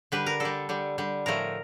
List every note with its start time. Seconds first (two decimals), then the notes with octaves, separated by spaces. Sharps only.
0.12 D3 G3 B4
0.26 A#4
0.40 D3 G3 A4
0.69 D3 G3
0.98 D3 G3
1.26 A2 F3 A3 A#4